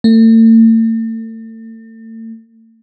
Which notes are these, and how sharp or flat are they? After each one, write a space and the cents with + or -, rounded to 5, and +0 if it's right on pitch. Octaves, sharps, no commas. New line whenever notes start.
A3 +40